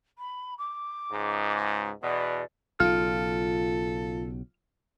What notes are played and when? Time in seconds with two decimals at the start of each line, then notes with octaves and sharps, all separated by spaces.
0.18 B5
0.58 D6
1.12 C#2 G#2
2.03 E2 B2 D5
2.80 B1 C#3 F4 A4 F6